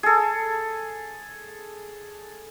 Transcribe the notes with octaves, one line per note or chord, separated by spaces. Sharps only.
G#4 A4